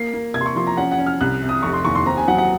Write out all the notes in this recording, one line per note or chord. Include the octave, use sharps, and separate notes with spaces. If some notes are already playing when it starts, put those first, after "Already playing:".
Already playing: A#3 C7
A#3
C3 G#6
C6
C#6
F3 C6
A#5
C#4 F#5
F#5
C#4
F6
C2 F#6
C3
D#6
F1 C#6
C6
D#2 C#6
C6
C4 A#5
G#5
F#3 F#5
F#5